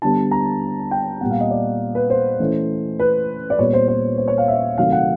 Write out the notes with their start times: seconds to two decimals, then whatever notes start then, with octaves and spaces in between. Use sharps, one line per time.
0.02 D3 G3 B3 A5
0.31 A#5
0.91 G5
1.21 A#2 G3 B3 F#5
1.31 F5
1.41 D#5
1.51 D5
1.95 B4
2.10 C5
2.40 E3 A3 C#4
2.99 B4
3.50 D5
3.59 A#2 G3 B3 C#5
3.73 C5
3.88 C5
4.18 C5
4.28 C#5
4.38 F5
4.48 E5
4.77 C3 D#3 F#3 A3 F5
4.92 F#5